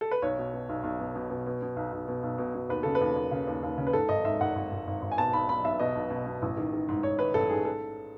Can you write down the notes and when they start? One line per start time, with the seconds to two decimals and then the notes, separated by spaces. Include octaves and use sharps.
0.01 A4
0.11 B4
0.22 B1 C#5
0.38 B2
0.53 B2
0.69 B1
0.83 B1
0.99 B2
1.15 B2
1.30 B2
1.46 B2
1.62 B2
1.76 B1
1.93 B1
2.08 B2
2.23 B1
2.38 B2
2.55 B2
2.69 D#2 B4
2.83 C#3 A4
2.95 B4
3.01 D#2
3.16 D#2
3.31 C#3
3.47 D#2
3.63 D#2
3.78 C#3
3.87 B4
3.93 G#2 A4
4.09 G#1 D#5
4.25 G#2 E5
4.41 G#1 F#5
4.56 G#1
4.71 G#1
4.87 G#1
5.02 G#1
5.11 G#5
5.18 B2 A5
5.33 B1 B5
5.48 B2 B5
5.64 B1 E5
5.79 B2 D#5
5.96 B1
6.10 B2
6.26 B2
6.42 A1
6.57 D#3
6.73 D#3
6.88 G#2
7.03 G#2 C#5
7.19 D#3 B4
7.34 A1 A4
7.50 G#2 G#4
7.65 A4